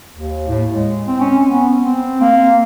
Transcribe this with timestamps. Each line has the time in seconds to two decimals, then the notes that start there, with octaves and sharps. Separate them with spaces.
0.15 D#2
0.48 A2
0.74 G#3
1.07 C4
1.20 C#4
1.49 B3
1.83 C4
2.21 A#3